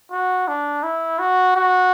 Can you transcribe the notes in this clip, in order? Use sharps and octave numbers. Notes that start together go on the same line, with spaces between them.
F#4
D4
E4
F#4
F#4